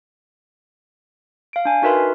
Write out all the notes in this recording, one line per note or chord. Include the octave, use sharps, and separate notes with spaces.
F5 D7
D4 G#5
D#4 F#4 A#4 B4 E5 C6